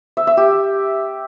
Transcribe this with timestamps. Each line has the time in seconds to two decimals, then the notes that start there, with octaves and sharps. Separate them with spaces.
0.17 E5
0.27 E5
0.37 G4